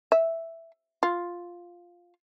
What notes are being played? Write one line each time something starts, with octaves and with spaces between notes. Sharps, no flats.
E5
F4